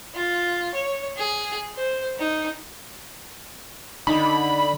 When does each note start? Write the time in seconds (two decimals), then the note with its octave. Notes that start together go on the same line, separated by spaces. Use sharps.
0.15 F4
0.75 C#5
1.17 G#4
1.77 C5
2.19 D#4
4.07 D3 D#3 D#4 B5